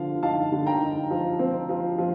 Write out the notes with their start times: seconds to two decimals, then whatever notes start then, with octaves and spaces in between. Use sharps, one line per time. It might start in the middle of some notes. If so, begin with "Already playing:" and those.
Already playing: D3 F3 F5
0.23 D#4 F5 A5
0.52 D3
0.66 G5 A#5
0.81 D#4
1.10 F3
1.39 C4
1.69 F3
1.98 F3